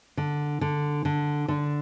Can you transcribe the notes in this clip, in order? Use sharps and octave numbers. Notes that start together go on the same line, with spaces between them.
D3
D3
D3
D3